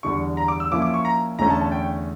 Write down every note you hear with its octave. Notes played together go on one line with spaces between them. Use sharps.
E2 D3 G3 C#6
A#5
D6
E6
A#2 F3 C#4 E4 D6
D6
C#6
A#5
E2 D3 A3 C#4 A#5
A5
A5
G5